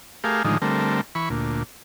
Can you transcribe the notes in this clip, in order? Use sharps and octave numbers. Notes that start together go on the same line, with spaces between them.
A3 G4 G#4 A#4 F5
A2 D3 D#3 F3 G#3 D#4
D3 G3 A3 C4 A#4
E3 B5 C#6
D2 A#2